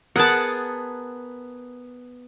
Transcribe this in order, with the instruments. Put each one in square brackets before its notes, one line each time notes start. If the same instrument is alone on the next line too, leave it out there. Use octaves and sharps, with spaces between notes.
[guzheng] B3 G#4 A#4 [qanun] F#5 A5